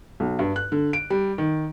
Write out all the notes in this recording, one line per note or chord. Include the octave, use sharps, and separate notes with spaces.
B1
G2
F#6
D3
D7
G3
D#3